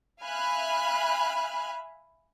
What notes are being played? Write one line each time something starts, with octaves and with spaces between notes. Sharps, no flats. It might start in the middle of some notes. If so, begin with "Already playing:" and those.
E5 F5 G#5 B5 F6 F#6